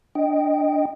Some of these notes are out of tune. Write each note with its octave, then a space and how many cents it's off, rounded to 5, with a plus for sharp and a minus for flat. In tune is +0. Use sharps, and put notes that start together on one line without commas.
D4 +0 D#5 +0 G5 +0